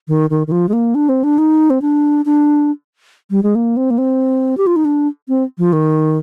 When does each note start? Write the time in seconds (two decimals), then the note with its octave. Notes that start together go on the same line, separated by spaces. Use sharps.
0.08 D#3
0.30 D#3
0.47 D#3
0.52 F3
0.69 G#3
0.73 A#3
0.95 D4
1.09 C4
1.24 D4
1.38 D#4
1.70 C4
1.82 D4
2.25 D4
3.31 G3
3.43 G#3
3.55 A#3
3.77 C4
3.91 A#3
3.98 C4
4.57 G4
4.67 F4
4.76 D#4
4.85 D4
5.28 C4
5.58 F3
5.73 D#3